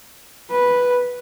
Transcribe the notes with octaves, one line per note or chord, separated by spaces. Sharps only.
B4